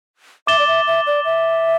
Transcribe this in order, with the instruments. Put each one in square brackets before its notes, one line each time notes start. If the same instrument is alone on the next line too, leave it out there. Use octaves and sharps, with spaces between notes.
[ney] E5 [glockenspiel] D6 A6 E7 G7
[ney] D5
E5
E5
D5
E5